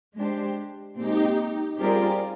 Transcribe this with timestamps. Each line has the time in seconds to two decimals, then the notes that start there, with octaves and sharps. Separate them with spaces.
0.17 G#3 D4 G4 C5
0.97 A#2 G#3 C4 D#4 G4
1.78 G3 C4 F4 G4 G#4 A#4 D5